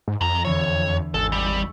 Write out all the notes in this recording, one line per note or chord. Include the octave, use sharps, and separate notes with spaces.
G#2
F2 D#3 A#5
E2 D3 E3 C#5
G#1 G#3 A4 E6
G3 C#6